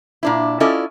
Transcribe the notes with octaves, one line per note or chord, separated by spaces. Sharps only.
A#2 D4 E4
C#4 E4 F4 A4 D5 D#5